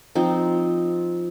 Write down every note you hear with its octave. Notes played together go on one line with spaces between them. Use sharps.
F3 C4 D#4